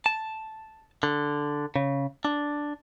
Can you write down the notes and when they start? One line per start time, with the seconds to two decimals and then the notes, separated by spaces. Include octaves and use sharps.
0.06 A5
1.03 D3
1.76 C#3
2.25 D4